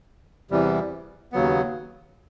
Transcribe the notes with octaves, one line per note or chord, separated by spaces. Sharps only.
E2 C3 E3 G3
D#2 C#3 F#3 B3